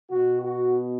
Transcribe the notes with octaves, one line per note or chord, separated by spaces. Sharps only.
B2 F#4
F#4